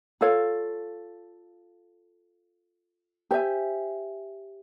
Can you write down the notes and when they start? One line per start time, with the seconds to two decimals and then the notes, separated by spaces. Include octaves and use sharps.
0.21 F4 A4 C#5 F5
3.31 G4 C5 E5 G#5